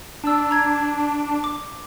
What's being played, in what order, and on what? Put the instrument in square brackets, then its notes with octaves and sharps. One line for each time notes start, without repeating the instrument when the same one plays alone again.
[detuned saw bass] D4 [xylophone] A5 E6
[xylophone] A#5 G#6
D6